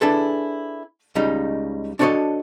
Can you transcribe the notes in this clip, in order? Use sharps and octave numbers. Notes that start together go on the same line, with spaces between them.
D4 E4 G#4 A4 B4
C#2 C#3 G3 D#4
D4 F#4 A4 B4 C#5 D#5